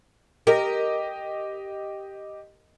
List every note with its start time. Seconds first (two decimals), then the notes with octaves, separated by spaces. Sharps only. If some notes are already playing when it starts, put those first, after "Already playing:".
0.47 G4 A#4 D#5